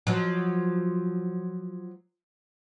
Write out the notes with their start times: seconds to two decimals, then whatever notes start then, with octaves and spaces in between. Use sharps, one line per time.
0.07 F3 F#3